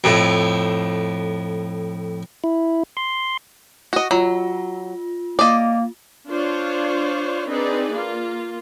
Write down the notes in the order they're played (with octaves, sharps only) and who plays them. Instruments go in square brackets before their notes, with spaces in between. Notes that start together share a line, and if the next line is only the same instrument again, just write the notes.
[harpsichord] F2 A2
[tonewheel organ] E4
C6
[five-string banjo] F#4 D#5
[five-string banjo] F#3 [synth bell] F4
[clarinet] A#3 [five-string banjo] D5 D#5
[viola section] D4 F4 C5 C#5
C4 D4 D#4 G#4 B4 D5
A#3 F4